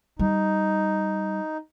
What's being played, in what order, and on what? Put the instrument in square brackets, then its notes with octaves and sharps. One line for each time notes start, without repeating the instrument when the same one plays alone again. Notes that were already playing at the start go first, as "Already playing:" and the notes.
[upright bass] G3 [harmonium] D#4